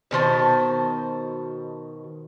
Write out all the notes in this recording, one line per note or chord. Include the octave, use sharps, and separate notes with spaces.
B2 D#3 C5 A5